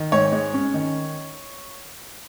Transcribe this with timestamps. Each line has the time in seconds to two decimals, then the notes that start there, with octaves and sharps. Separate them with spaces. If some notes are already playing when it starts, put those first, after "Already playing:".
Already playing: D#3
0.12 G#2 C#5
0.32 G#3
0.54 C#4
0.74 D#3